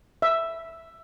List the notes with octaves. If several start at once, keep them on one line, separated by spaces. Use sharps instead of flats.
E5